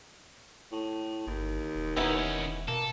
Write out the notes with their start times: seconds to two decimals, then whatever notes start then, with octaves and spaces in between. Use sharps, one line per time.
0.72 A2
1.27 G1 D#2
1.75 E1
1.97 E1 D#3 B3 C#4 D#4 E4
2.68 B2 A#3 A4